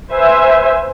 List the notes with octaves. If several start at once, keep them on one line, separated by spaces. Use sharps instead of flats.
B4 C5 E5 G#5